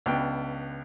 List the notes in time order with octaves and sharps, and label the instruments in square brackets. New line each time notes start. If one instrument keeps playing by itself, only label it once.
[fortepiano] C#2 B3 D4 G5